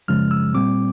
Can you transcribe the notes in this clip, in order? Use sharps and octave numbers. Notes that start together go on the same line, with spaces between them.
F#2 C#3 F3 G#3 F6
E6
A#2 G3 C4 D6